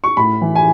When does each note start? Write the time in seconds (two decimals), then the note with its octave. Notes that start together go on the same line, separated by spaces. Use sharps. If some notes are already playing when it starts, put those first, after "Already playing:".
0.04 C#6
0.17 A2 B5
0.41 E3
0.55 G#5